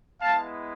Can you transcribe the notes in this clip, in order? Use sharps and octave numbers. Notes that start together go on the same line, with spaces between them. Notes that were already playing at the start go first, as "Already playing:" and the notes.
G#3 B3 E4 F5 A5